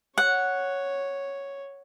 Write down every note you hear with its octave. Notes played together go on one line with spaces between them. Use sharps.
C#5 F#5